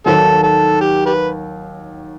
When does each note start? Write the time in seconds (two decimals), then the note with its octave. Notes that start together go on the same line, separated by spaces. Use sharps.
0.06 D#2 D#3 F#3 C4 A4
0.43 A4
0.81 G4
1.06 G4 B4